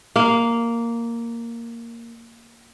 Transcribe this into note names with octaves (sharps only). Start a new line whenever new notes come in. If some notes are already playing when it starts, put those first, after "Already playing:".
A#3 F5